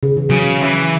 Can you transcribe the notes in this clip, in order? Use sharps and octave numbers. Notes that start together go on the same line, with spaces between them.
C#3
E3
C#3 F#3
E3